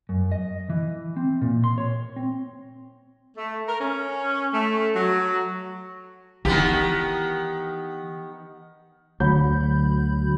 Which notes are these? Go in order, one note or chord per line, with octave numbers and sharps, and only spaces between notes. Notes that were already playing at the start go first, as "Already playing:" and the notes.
F#2
D#5
E3
C4
A#2
C6
C#5
C4
A3
A#4
C#4
A3
F#3
D#3 E3 B3 G4
D2 D3 F#3 B5 G6